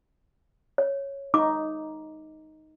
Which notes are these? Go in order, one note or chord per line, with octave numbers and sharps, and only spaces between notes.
C#5
D#4 D6